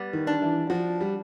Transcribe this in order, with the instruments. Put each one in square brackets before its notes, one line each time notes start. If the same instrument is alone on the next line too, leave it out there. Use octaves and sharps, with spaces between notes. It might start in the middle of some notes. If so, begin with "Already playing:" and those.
Already playing: [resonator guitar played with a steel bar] G3 B3
[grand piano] D#3
[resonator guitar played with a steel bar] D4
[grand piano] E3
[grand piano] F3 [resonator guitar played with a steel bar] F#4
[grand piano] G3